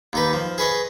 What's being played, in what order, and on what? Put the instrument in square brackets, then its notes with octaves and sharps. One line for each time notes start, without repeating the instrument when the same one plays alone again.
[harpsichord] D#2 D#4 B4
F3
G#4 B4 C#5 D#5